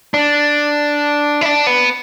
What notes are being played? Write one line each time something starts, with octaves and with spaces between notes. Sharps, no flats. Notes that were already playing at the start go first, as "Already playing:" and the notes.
D4
E4
D4
B3